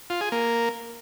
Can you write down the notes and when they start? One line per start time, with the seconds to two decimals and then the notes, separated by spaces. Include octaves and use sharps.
0.10 F4
0.21 G#4
0.32 A#3